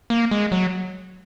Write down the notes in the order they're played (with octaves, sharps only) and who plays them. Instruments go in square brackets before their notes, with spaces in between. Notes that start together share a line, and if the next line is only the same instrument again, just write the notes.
[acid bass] A#3
G#3
F#3